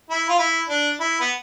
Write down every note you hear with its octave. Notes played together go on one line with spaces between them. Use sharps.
E4
F4
E4
D4
E4
B3